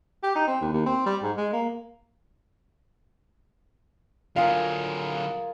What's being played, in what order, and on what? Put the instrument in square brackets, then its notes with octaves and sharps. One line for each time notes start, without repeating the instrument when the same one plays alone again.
[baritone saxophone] G4
D#4
C4
D#2
D#2
C4
G3
G#2
G#3
A#3
[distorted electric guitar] D3 F#3 [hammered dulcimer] F4 G#4 A#4 [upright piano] F5